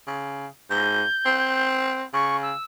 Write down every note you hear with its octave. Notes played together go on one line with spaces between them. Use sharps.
C#3
G#2 G6
C4
C#3 C#6
E6